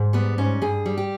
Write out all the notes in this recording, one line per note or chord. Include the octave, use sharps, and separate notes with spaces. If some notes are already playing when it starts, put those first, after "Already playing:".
Already playing: G#2
G3 B3
G#2 C#4
G2 G#4
G3
G4